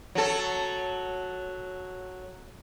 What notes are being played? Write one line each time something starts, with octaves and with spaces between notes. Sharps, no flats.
F#3 A4